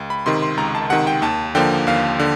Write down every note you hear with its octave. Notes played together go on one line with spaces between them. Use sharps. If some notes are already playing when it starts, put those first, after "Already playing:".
Already playing: C#2
B5
C3 D#3 C6
C6
C#2 A#5
A5
C3 D#3 F#5
G5
D#2 A5
D3 F3 A#3 G5
D#2 F5
D3